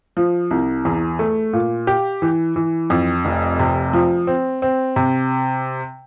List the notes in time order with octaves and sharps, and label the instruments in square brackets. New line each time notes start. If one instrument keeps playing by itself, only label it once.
[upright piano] F3
C2
E2
A3
A#2
G4
E3
E3
F2
F1
C3
F3
C4
C4
C3